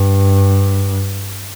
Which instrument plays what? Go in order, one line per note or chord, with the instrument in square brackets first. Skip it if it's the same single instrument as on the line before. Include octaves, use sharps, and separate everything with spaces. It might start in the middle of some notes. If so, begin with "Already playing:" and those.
Already playing: [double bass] G2